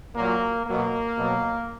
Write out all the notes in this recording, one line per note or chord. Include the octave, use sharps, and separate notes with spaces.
A#2 F#3 A#3
B2 F#3 A#3
B2 F#3